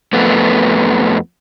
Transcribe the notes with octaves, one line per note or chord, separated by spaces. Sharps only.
F2 A3 B3